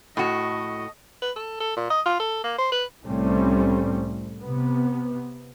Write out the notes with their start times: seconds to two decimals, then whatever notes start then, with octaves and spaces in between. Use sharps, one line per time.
0.17 A2 F#4 D#5
1.22 B4
1.36 A4
1.60 A4
1.77 A#2
1.90 D#5
2.05 F4
2.20 A4
2.44 A#3
2.58 C5
2.72 B4
3.05 C2 A2 G3 A3 C4 C#4
4.40 C3 B3